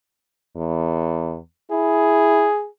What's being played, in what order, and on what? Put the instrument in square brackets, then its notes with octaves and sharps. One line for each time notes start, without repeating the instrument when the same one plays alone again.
[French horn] E2
[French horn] E4 [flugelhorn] G#4